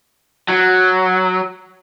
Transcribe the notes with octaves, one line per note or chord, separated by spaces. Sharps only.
F#3